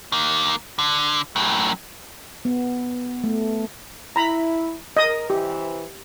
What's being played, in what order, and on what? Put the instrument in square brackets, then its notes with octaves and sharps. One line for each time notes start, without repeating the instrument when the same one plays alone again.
[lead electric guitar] D#3 A#3
D3
F#2 A2
[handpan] B3
A3
[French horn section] E4 [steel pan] A#5 B5
[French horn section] A#4 [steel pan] D#5 D#6
[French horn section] C3 E3 [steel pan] G4